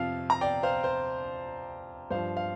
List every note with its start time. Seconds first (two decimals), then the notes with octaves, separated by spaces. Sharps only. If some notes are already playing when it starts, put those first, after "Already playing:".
Already playing: F2 C3 F3 F5
0.30 A#5
0.41 D5 G5
0.63 C5 F5
0.84 C5
2.11 G2 F3 C5 F5
2.37 F5